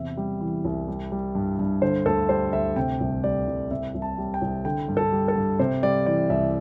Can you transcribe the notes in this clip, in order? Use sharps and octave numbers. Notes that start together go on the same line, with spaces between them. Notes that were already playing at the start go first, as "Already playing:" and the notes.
Already playing: E2 C3 E5
G3
E3
C2
G3
G3
G2
G2
D3 C5
D2 A4
G3 C5
D2 E5
C3 G5
C2
G3 D5
C2
C3 E5
C2
A5
G3
G5
C2
D3 G5
G2
A4
G3
A4
G2
C3 C5
G3 D5
E3 D5
C2 E5